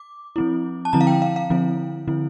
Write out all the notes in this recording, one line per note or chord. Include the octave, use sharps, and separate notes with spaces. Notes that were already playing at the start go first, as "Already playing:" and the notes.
Already playing: D6
F3 C4 E4
A5
D3 F3 C4 E4 A#5
F5
G5
F5
F5
D3 F3 C4 E4
D3 F3 C4 E4